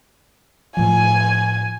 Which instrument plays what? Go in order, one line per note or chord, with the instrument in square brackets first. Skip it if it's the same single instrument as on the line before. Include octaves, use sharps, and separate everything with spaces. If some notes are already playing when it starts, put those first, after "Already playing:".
[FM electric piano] A2 F3 [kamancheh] G#5